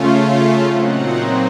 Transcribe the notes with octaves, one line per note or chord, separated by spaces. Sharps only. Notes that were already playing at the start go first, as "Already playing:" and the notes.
Already playing: C#3 A3 C#4 F4
A5
A#2 F#3 C4 D#4 F#5